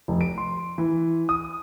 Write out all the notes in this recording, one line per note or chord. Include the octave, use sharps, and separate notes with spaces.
F1
D7
C6
E3
D#6